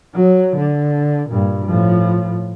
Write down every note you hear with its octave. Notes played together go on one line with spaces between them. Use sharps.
F#3
D3
G2 A#2
A2 F3